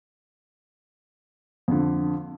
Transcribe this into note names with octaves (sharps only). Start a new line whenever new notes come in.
F2 D3